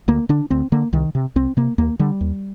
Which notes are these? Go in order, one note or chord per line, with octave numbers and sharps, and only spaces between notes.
D2 A#3
D3 D4
D2 C4
D3 A#3
C2 D#3
C3
C2 C4
C3 A#3
D#2 A#3
D3 G3
D#2